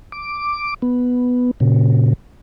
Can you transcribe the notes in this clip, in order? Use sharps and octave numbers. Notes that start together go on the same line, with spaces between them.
D6
B3
A#2 C#3